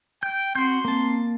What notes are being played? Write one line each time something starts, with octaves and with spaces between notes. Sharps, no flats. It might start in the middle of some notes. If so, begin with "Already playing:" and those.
G5 G6
C4 F#4 C6 G6
A#3 C4 A5